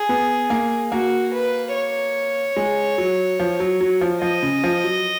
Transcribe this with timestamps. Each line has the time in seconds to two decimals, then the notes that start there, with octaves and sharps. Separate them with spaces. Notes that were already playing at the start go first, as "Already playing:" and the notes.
Already playing: G#4
0.09 B3
0.50 A#3
0.92 A#3 F#4
1.33 B4
1.74 C#5
2.56 G#3
2.98 F#3
3.40 F3
3.60 F#3
3.81 F#3
4.01 F3
4.22 F3 D#5
4.43 C#3
4.64 F3
4.84 F#3